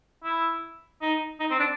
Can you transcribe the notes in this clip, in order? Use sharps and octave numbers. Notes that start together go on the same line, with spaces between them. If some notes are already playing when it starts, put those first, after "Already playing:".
E4
D#4
D#4
C4
D4